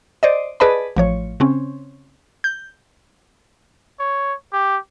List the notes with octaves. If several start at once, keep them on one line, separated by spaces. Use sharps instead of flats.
C5 D5 D#5
G#4 B4 D5 D#5 A5 B5
A1 F3 C#5
C#3 C4 C#4
G6
C#5
G4